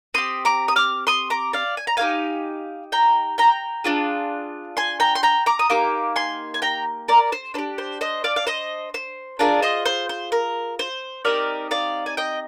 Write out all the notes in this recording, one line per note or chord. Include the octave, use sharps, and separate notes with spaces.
C4 G4 C6 D#6
A#5 D6
D#6
D6 F6
C6 D#6
A#5 D6
D5 F5
G#5
A#5
A#3 D#4 G4 F5 G#5
G5 A#5
G5 A#5
D4 F4 G#4
G#5 C6
G5 A#5
C6
G5 A#5
A#5 D6
D#6
A#3 D#4 G4 D6
G#5 C6
G#5
G5 A#5
A#4 D5
C5
D4 G4 C5
C5
C5 D#5
D5 F5
F5
C5 D#5
C5
D4 F4 G#4 A#4 D5
C5 D#5
C5
C5
A#4
C5
C4 D#4 G4 A#4 D5
D5 F5
G#5
D#5 G5